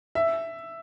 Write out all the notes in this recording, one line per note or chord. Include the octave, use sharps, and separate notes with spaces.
E5